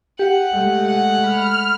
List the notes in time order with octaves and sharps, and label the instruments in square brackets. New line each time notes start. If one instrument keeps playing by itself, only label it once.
[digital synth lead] G4 [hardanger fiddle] F#5
[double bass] G#3 A3
[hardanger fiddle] F#5
[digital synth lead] B5 [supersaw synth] F6